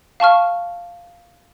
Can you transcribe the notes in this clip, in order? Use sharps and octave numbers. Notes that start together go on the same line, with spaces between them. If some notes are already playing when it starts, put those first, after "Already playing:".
F5 A5 C#6 F6